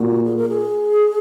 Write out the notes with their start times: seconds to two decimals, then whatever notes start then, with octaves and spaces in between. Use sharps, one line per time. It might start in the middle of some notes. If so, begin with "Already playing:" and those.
Already playing: A#2 F#4
0.24 G#4
0.36 A#4
0.49 G#4